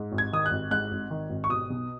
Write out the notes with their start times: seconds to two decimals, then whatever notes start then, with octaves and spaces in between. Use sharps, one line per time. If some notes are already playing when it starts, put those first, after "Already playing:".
Already playing: G#2
0.12 G#1
0.18 G#6
0.33 D#3 D#6
0.46 F#6
0.51 G#1
0.71 G#2 F#6
0.91 G#1
1.10 D#3
1.30 G#1
1.44 C#6
1.49 B2 D#6
1.70 B1